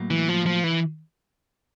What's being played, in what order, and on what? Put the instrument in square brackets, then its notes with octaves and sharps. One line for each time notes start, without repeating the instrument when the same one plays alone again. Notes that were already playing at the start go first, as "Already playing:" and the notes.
Already playing: [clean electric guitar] A2 F#3 A#3
[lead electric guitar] E3
F3
F3
E3